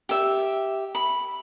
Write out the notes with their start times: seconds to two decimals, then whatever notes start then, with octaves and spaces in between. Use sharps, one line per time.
0.09 G4 E5
0.95 B5